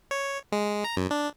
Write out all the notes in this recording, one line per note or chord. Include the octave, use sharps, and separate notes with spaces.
C#5
G#3
A#5
F#2
D4